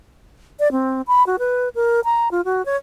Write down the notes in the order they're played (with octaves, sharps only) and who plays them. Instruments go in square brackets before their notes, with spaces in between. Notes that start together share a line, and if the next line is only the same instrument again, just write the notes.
[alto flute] D5
C4
B5
F#4
B4
A#4
A#5
F4
F#4
C#5